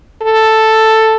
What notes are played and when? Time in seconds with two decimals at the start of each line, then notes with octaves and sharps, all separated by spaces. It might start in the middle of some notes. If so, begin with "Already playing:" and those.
0.22 A4